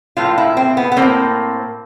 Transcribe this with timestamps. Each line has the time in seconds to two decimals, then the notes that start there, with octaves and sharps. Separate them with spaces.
0.17 A2 F3 A#3 F4
0.38 E4
0.57 C4
0.77 B3
0.92 B3
0.97 F3 A#3 C4
1.02 A2